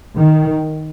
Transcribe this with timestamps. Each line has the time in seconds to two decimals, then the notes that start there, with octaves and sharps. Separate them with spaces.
0.15 D#3